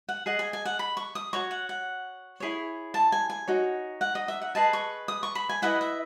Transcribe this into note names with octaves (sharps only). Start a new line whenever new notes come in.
F#5
G#4 D#5 F#5
G#5
G#5
F#5
B5
C#6
D#6
F#4 C#5 C#6
F#5
F#5
E4 G#4 C#5
A5
G#5
G#5
D#4 F#4 C#5
F#5
D#5
E5
F#5
G#4 B4 D#5 A5
C#6
D#6
C#6
B5
G#5
E4 B4 D#5 F#5
E5